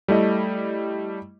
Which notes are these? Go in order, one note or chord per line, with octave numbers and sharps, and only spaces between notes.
G3 A3 E4 D#5